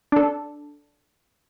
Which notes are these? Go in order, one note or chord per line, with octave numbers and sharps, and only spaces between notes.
D4 A4